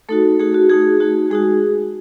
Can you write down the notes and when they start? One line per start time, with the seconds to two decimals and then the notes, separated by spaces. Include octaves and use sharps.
0.09 A3 D#4 F#4 A4
0.39 A3 D#4 F#4 G#4
0.54 F#4
0.70 A3 D#4 F#4 G#4
1.00 A3 D#4 F#4
1.30 G#3 D#4 F#4 G#4